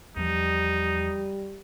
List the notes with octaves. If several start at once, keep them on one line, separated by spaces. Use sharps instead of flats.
E2 F3 G3 D#4